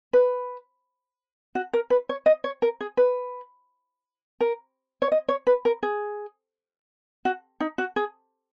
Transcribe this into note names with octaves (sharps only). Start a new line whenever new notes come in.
B4
F#4
A#4
B4
C#5
D#5
C#5
A#4
G#4
B4
A#4
C#5
D#5
C#5
B4
A#4
G#4
F#4
D#4
F#4
G#4